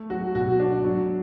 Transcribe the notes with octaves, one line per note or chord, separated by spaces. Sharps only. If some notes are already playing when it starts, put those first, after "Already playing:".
Already playing: A3
F#3 F#4
B2 F#4
D4
F#3